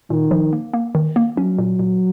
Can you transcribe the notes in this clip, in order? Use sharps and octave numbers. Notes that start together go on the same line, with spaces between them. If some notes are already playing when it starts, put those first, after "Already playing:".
A#2 D#3
F3
A#3
A#3
D#3
A#3
F#3 C#4
A#2
A#2